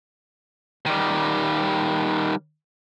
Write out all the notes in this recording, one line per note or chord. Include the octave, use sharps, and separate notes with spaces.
D#3 G3